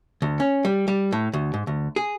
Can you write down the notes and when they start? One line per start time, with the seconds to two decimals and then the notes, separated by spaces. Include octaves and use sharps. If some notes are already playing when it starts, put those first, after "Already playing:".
0.22 D2
0.40 C#4
0.65 G3
0.88 G3
1.12 A2
1.33 D2
1.54 G#2
1.67 D2
1.96 G#4